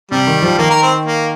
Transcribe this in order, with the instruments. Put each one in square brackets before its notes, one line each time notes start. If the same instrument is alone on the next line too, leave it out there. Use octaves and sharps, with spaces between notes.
[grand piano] C3 [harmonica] G3
[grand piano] D#3
F3
[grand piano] D#3 [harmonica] A#3
[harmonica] A#4
C4
A#3